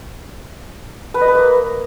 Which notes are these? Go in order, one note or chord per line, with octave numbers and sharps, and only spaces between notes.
B4
D#5
B4
A#3